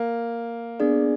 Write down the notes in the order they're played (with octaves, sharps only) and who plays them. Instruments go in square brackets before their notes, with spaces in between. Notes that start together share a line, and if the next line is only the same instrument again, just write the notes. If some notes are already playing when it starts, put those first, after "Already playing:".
Already playing: [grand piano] A#3
[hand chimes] B3 D4 G#4 D5